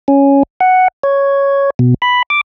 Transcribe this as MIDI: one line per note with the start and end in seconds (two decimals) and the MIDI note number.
0.08 0.43 61
0.60 0.88 78
1.04 1.70 73
1.79 1.94 47
2.02 2.23 83
2.30 2.41 86